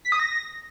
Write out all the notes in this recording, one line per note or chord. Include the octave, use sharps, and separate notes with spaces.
B6
D#6
A#6